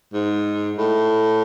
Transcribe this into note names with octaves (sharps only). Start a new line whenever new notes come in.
G#2
A2